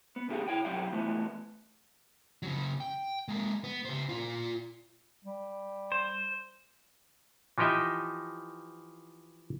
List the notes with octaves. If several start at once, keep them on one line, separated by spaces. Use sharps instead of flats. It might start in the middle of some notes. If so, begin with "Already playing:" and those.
B3
A#2 D3 E4 G4 G#4 F5
C#3 F3 E4 C#5 G5
C2 B2 F#3 G3 F5 G5
E3 F3 A3 B3
C#3 F#3
G5
G#3 A#3
B3
C#3 C5
A#2 F4
G3
C5
E3 F3 D#4 G4 D#5 E5